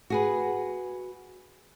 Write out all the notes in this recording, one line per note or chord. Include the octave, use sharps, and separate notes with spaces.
F#4 G#4 B4